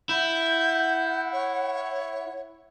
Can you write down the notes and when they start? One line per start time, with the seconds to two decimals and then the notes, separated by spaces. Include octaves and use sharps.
0.09 E4 F#5 G6
1.33 C#5